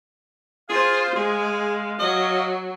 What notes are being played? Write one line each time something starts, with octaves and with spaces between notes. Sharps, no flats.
F4 G#4 C5 F5
G#3 G#4
F#3 D#5